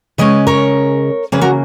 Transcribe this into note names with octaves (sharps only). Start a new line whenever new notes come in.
C#3 G#3 C#4 B4 D#5
A#4 C#5
C#3 E3 A#3 G#4 B4
F#4 A#4